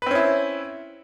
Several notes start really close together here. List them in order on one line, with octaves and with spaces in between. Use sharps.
B4 C4 C#4 E4